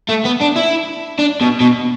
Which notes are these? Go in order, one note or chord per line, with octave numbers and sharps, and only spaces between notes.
A3
B3
D4
E4
D4
B2
B2